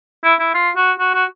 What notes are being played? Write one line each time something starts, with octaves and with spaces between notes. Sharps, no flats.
E4
E4
F4
F#4
F#4
F#4